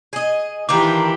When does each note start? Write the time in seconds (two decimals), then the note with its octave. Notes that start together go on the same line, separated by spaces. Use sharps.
0.13 G#4 D#5
0.69 D#3 E3 D4 F4 G4 D6